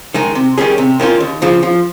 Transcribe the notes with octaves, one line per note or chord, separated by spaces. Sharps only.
D#3 G#3 D#4
C3
D#3 G3 C#4 G#4
C3
D#3 A#3 C#4 F4
D#2
C#3 F3
F3